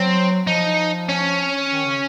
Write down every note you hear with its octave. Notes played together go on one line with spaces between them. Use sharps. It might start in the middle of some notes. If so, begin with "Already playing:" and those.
Already playing: F#3 C4
F3 D#4
C#4
D#3
C#3